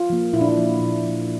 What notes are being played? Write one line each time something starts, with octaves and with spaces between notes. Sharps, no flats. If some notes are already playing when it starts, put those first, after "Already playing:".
Already playing: F4
F3 A#3
A#2 E4
D4
E4
F3 A#3
A#2
F3 A#3